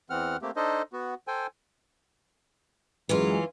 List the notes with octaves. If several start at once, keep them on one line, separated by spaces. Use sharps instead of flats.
E2 E3 C4 F#5 F6
A3 A#3 C4 G4
D4 D#4 A4 C5 D#5
B3 F#4
A4 C5 G5 G#5
F#2 E3 F#3 G#3 C#4 F4